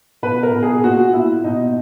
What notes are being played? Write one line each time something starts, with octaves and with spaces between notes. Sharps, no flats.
B2 B4
A#4
B2
G#4
A#2 F#4
A#2 E4
B2 D#4